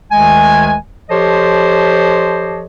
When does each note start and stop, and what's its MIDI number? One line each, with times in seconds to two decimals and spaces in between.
0.12 0.74 38
0.12 0.74 51
0.12 0.74 56
0.12 0.74 80
1.10 2.65 53
1.10 2.65 67
1.10 2.65 69
1.10 2.65 72
1.10 2.65 73
1.10 2.65 75